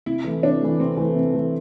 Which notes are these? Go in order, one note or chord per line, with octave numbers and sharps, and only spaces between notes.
C3 E4
E3 A3
C3 D4
E3 A3
C3 C4
E3 A3
C3
E3 A3